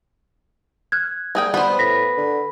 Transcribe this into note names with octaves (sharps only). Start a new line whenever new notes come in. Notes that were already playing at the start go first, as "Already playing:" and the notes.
F6 F#6 G#6
G3 A#3 G#4 G5
G3 B3 B4 C5
A2 A#6 B6
D3